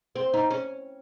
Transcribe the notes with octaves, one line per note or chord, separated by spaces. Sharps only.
C4
D#4
C#4